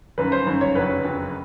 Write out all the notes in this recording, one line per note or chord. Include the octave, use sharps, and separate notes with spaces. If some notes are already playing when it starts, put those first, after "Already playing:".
G1 F#2 D#3 B4
C5
G1 F#2 D#3
C#5
F#1 F2 D3 F#3 B4
F#1 F2 D3 F#3